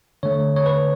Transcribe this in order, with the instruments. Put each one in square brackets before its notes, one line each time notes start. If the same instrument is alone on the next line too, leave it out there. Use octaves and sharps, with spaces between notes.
[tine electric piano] D3 A3 C#5
C#5
B4